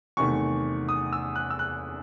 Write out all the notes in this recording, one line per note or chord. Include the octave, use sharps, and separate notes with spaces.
E2 C3 D#3 A3 C#6
D#6
E6
F#6
E6
F#6